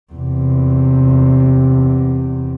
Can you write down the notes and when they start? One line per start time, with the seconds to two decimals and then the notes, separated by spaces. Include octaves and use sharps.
0.13 E2 C3